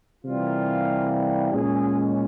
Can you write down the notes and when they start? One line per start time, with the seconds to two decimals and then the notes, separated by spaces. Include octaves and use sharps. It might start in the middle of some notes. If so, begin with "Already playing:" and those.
0.23 C3 E3 G3 A#3 F4
1.51 A#2 G#3 C#4 G#4